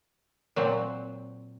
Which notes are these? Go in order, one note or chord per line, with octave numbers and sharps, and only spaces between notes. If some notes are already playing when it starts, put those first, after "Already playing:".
A#2 F#3 C4